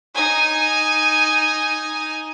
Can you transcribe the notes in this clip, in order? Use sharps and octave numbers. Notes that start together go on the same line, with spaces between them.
D#4 G#5